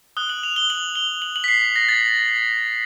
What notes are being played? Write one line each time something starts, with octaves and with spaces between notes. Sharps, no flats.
D#6 F#6 G7
F#7
F7
G7
F#7
G7
F#7
F#7
B6
C7
B6
A#6
A6